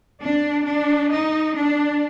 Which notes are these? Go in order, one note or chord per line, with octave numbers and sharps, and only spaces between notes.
D4
D4
D#4
D4